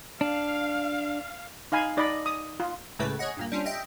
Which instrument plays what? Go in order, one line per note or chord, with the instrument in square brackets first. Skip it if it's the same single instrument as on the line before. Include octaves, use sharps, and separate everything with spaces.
[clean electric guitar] D4 [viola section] F5
[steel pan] D#4 F5 G#5 B5
D#4 D5 D#5 B5
D#6
F4
[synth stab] C#2 A2 C#3 A3 B4
G#4 C#5 D#5 F#5
G2 A#2 A#3
G3 C#4 D4 F4
D#5 E5 G5